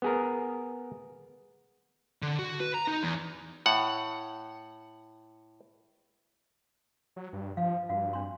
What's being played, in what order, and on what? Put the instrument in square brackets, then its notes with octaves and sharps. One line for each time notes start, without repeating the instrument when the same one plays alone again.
[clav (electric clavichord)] B3 G#4 A#4
[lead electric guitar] D3
F#4
B4
A#5
D#4
E2
[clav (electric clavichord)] A2 F#5
[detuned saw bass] F#3
G2
[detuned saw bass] F3 [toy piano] F5
[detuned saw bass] G2 [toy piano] F#4 F5
[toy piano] D4 C6